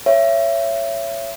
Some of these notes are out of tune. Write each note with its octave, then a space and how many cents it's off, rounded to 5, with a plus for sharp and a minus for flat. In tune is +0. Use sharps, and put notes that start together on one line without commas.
C#5 +0 E5 +25